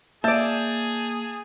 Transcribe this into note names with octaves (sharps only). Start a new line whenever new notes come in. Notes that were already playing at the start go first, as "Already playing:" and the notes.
A#3 G#4 D5 E5 A5 G6 A6